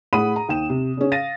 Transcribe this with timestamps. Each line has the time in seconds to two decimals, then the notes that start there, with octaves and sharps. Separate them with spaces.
0.13 A2 G#4 F#5 B5 D#6 D#7
0.36 A#5
0.48 D#2 G5 E7
0.69 C3
0.97 C#3 C#4
1.12 F5 A6 A#6 D#7